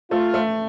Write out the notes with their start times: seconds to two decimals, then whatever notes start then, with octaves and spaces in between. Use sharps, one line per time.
0.11 A3 F4
0.34 A3